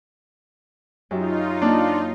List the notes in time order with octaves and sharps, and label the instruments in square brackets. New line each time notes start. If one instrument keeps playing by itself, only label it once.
[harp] F#2 G4 E5 [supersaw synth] D#4 F4
[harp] A#3 [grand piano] D4 A5